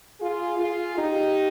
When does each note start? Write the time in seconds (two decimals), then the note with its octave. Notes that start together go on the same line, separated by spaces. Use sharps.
0.20 F4 G#4
0.59 F4 G#4
0.98 D#4 G4